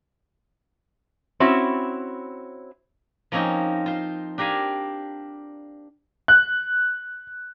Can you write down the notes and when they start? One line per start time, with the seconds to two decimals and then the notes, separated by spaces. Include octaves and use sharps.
1.40 C4 C#4 E4 F#4
3.32 F3 A#3 C4 C#4 D#4
3.86 F4 C5
4.38 D4 G4 A#4 F5 G#5
6.28 F#6